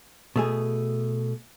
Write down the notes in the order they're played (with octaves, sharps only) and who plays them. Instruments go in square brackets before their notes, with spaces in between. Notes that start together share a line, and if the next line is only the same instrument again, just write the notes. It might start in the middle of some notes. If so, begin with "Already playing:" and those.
[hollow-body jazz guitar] B2 A3 G#4